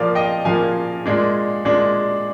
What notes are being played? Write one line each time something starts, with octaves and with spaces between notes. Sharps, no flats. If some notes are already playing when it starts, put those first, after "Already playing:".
Already playing: A#2 F3 A#3 D5 F5
D#5 G5
A#2 F3 A#3 F5 G#5
A#2 G#3 D4
A#2 G#3 D4